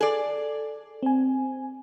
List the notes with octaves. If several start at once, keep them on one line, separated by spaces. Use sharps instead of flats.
G#4 A4 D5
C4 G#5